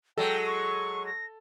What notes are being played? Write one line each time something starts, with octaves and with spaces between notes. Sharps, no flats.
F#3 G#3 A4 G5
C#6
A#6